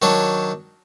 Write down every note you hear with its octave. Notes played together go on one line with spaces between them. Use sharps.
D#3 F#3 D4 C#5